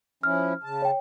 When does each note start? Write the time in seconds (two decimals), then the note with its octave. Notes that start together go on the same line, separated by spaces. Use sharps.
0.23 F3 C#4 E4 F6
0.64 C#3 A5
0.82 C#5 G5